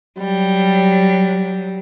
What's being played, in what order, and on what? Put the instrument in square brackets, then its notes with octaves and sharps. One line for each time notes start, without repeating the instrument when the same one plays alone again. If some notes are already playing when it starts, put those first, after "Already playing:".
[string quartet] F#3 G3